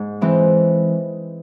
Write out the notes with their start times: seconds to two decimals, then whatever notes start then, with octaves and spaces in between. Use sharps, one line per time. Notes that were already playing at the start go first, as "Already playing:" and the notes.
Already playing: G#2
0.21 E3 G#3 C4